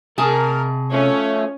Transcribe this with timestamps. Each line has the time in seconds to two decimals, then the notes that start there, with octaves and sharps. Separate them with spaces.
0.18 C3 G#4 A#4 A5
0.90 F3 A3 C#4